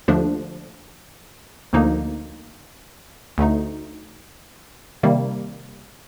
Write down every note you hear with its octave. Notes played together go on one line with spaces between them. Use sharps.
D#2 D3 F3 A3 D4
D2 D3 F3 A#3 D#4
D2 D3 A3 D#4
C3 D#3 G3 A#3